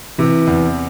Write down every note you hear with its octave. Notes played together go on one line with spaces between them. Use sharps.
C3 E3
E2